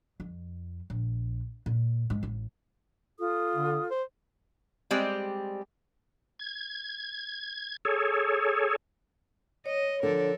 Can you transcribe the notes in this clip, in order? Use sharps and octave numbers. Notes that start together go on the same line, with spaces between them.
F2
A#1
A#2
G#2
A1
F4 A4 D#6
D3
C5
G3 G#3 C4 G4 D5
G#6
G#4 A4 C#5
C#5 D#5
D3 F3 A4 A#4